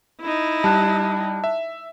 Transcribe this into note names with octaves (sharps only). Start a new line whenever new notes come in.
D#4 E4
G3 A5 F#6
E5